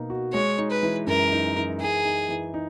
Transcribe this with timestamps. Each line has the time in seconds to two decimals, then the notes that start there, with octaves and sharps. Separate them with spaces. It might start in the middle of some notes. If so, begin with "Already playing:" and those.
Already playing: B2 A#3 D#4
0.10 F#4
0.33 G#3 C#5
0.58 D#4
0.71 B4
0.83 E3
1.07 F#2 A#4
1.31 D#4
1.56 E3
1.80 D#4 G#4
2.05 D#4
2.29 E3
2.54 D#4